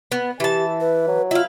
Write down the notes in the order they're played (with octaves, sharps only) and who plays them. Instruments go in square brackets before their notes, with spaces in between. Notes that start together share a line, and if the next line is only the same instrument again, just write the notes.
[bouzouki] B3
[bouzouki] E3 A5 [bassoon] E4 [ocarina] G4
[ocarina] B4
[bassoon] F#3
[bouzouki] E4 F5 [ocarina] F4